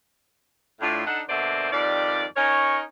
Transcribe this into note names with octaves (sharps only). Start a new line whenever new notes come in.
A2 D4 F4
D4 D#4 A4 F#5
B2 D3 A#3 C5 D5 E5
F2 D#3 G3 D5
C#4 D#4 A#4 C#5